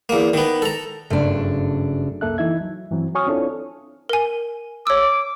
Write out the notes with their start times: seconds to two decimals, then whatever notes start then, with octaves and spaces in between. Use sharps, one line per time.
0.09 E2 A#3
0.34 D#3 B3
0.62 A4 A#5
1.10 F#1 G2 A3 D4 F4
2.21 C2 F#2 A#3 A4 E5 F#6
2.38 E3 D#4 E4 E5 G#6
2.61 F#3
2.91 G2 E3 F#3 C4
3.15 F#4 C#5 G#5 C#6 D#6 F6
3.26 C4 D4 E4 F4 A4 C#5
4.09 A#4 G#5
4.87 C#5 D6 E6